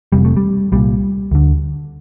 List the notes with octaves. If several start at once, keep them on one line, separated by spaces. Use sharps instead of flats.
F1 F2 C3 G3
A3
G3
C2 A#2 G3
D2 D3